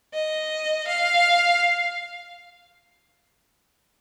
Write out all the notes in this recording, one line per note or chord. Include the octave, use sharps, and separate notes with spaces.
D#5
F5